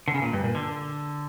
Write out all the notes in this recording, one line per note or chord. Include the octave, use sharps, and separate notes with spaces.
D3
C#3
A#2
G2
A#2
D3